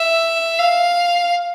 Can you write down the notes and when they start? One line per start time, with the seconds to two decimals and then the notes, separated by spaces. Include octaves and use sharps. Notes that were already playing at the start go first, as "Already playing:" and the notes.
Already playing: E5
0.58 F5